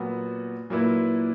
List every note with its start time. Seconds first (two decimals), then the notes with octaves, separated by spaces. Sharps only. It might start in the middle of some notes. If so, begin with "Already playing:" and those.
Already playing: A#2 F#3 B3 F#4
0.70 A#2 F#3 A#3 E4 B4